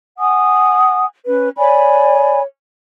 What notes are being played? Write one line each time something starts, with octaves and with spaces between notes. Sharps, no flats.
F#5 G#5 D#6
C#4 B4
C#5 D5 G#5 B5